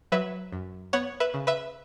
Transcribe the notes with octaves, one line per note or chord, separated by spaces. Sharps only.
F#3 B4 E5
F#2
B3 C#5 F#5
B4 E5
C#3
B4 E5